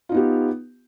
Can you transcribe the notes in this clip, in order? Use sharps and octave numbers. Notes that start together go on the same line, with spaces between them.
B3 D#4 F4 G4